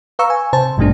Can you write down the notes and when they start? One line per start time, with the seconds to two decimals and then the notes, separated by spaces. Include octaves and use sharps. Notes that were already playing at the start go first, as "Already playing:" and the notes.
0.19 B4 F5 A#5 C#6 E6
0.30 G#5
0.53 C3 C5 A5
0.77 A1 G2 B2 G3 A3 D4